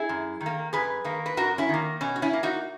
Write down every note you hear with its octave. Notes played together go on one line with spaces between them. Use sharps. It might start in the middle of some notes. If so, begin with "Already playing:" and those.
Already playing: E4 G#4
F#2
D#3
A#3
F#2 G#4 B4
D#3 A#3
B4
F#2 F#4 A#4
C#4 E4
D#3 A#3
B2 C#4
F#4
C#4 E4
A#3
D#4 F#4